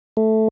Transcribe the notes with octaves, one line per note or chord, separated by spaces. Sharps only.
A3